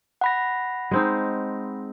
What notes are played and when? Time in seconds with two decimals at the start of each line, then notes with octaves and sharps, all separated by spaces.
0.21 F#5 B5 A#6
0.91 G#3 C4 D#4